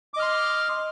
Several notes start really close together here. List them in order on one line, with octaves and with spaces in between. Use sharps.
D6 D#5 F6 C6